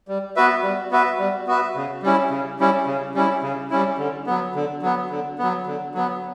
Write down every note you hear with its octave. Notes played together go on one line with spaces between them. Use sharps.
G3
B3 F#4 B4 E5
G3
B3 F#4 B4 E5
G3
B3 F#4 B4 E5
C#3
G3 C#4 E4
C#3
G3 C#4 E4
C#3
G3 C#4 E4
C#3
G3 C#4 E4
D3
F#3 B3
D3
F#3 B3
D3
F#3 B3
D3
F#3 B3